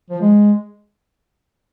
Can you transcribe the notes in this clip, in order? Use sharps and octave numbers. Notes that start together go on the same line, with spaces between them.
F3
G#3